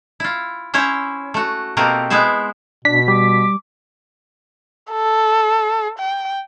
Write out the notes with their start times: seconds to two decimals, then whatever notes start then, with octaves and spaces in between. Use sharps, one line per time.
0.20 E4 F4
0.74 C#4 E4 C5 C#5
1.34 A3 F#4
1.77 B2 A3 A#3 C4 G4 A#4
2.10 G#3 B3 E4 C5 E5
2.85 B2 D4 B6
3.08 G3 D6
4.91 A4
5.99 G5